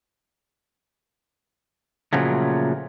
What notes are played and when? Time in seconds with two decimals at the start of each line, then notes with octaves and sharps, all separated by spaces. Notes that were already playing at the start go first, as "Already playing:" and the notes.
2.13 A#2 C#3 F3 F#3 A3